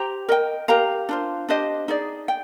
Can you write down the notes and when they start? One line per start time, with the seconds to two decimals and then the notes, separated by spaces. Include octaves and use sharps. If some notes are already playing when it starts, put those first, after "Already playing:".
Already playing: G4 C5 G5 A#5
0.29 A#4 D#5 G5
0.68 G4 A#4 F5 A#5
1.09 D4 F4 C5
1.49 D4 G4 C5 D#5
1.88 D#4 G#4 D5
2.28 G5